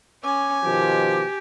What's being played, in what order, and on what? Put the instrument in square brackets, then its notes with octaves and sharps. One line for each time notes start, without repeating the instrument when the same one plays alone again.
[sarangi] C#4 [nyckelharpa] G#5 [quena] D6
[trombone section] B2 D#3 F3 [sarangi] G4